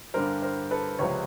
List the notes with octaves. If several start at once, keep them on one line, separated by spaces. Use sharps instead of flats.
G2 D3 G3 A#4 C5
A#4 C5
A4 B4
C#2 C3 F3 B4 C#5